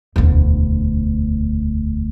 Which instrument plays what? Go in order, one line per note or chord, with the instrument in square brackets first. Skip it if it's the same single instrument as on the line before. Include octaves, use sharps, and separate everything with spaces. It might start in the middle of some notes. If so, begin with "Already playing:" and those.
[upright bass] E1 D2